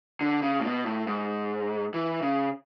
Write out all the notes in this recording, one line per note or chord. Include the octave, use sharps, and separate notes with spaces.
D3
C#3
A2
B2
A2
G#2
E3
C#3